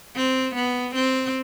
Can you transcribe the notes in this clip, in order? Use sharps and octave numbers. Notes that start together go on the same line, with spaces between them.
C4
B3
C4